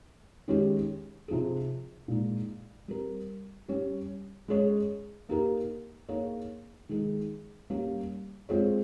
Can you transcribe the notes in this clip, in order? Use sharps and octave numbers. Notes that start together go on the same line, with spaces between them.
D#3 G#3 C#4 G4
C3 F3 C4 D#4 G#4
A#2 G#3 D#4
G3 C4 G4 A#4
G3 C#4 G4
G#3 C#4 G#4 C#5
A#3 D#4 G4 A#4
A#3 D#4 G#4 C#5
D#3 G#3 D#4 G#4
G3 A#3 C#4 G4 A#4
G#3 C4 F4 G#4 C#5